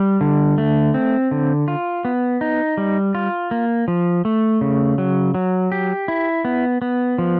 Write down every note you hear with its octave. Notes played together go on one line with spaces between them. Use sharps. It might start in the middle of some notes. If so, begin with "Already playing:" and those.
Already playing: G3
D3
A3
C4
D3
F4
B3
D#4
G3
F4
A#3
F3
A3
C#3
F#3
F#3
G4
E4
B3
B3
F3